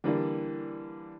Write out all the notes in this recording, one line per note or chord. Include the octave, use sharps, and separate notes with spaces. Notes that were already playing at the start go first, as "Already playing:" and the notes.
D3 E3 G3 A#3